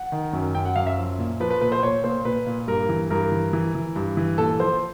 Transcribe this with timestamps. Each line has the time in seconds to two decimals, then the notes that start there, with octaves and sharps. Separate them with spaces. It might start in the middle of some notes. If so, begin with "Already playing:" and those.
Already playing: F#5
0.12 D#3
0.33 F#2
0.55 F#2 G5
0.65 F#5
0.76 F#2 F5
0.87 E5
0.98 F3
1.19 A#2
1.40 F3 B4
1.50 B4
1.61 A#2 B4
1.72 C5
1.83 A#2 C#5
2.04 A#2 C5
2.25 A#2 B4
2.47 A#2
2.67 G2 A#4
2.89 E3
3.10 G2 A#4
3.32 E3
3.53 E3
3.75 E3
3.96 G2
4.17 E3
4.38 A#2 A4
4.60 F3 C5